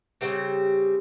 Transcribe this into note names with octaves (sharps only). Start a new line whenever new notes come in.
C#3 G3 C4